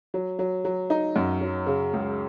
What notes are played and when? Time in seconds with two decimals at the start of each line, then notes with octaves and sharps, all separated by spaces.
0.14 F#3
0.39 F#3
0.65 F#3
0.90 D#4
1.16 F#2
1.41 F#3
1.66 C#3
1.93 C#2